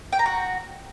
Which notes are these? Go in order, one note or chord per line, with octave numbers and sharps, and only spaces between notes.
G5
A#5
F#4